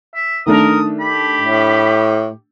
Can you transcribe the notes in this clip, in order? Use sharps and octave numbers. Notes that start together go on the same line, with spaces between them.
E5
D#3 A3 D4 A#4 D#6
G4 B5
A2